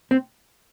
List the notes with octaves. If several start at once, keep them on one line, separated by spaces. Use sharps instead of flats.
C4